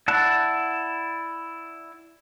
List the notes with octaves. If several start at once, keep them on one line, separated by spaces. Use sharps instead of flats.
E4 D5 F#5 A5 F#6